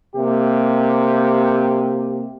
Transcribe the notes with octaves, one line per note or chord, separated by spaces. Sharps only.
C3 A#3 G4